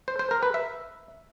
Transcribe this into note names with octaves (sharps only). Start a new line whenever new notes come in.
C5
C5
A#4
B4
E5